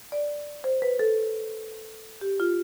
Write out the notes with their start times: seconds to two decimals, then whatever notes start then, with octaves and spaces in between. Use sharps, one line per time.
0.12 D5
0.64 C5
0.82 B4
0.99 A4
2.21 G4
2.40 F4